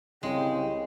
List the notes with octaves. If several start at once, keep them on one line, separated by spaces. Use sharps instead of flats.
C2 C#3 G#3 G5